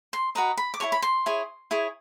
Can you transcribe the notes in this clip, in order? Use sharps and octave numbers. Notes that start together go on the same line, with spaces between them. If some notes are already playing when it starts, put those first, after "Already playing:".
C6
F#4 B4 D#5 A#5
B5
D6
E4 G#4 C#5 C#6
B5
C6
E4 G#4 C#5
E4 G#4 C#5